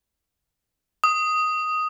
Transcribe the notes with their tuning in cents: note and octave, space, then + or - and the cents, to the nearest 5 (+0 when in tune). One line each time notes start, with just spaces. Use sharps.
D#6 +5